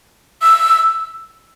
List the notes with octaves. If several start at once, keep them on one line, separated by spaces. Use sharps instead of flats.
E6